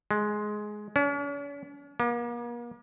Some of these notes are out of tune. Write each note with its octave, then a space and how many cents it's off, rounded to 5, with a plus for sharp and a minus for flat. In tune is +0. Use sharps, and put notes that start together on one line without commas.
G#3 +15
C#4 +45
A#3 +40